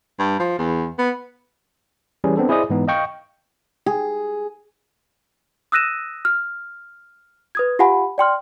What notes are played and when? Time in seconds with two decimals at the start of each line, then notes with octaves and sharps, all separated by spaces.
0.19 G2
0.40 F3
0.58 E2
0.99 B3
2.24 E3 G3 C#4 G#4
2.37 B3 C4 D4 A4
2.49 E4 G#4 C5 D5 D#5 D#6
2.70 G#2 E3 G#3 B3 D#4
2.88 D#5 F5 G5 C#6
3.86 G#4
5.72 D#6 E6 F#6 A#6 D#7 E7
6.25 F6
7.55 B4 D#6 G#6
7.79 F4 G4 F5 F#5 G#5 B5
8.18 D5 G5 C6 F6